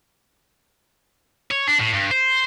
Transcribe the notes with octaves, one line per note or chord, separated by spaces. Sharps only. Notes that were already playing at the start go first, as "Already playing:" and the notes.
C#5
D4
A2
G2
C5